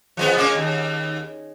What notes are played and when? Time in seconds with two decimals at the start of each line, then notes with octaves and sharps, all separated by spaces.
0.17 F3 G#3 B3
0.37 G#3 A#3 C#4
0.55 D#2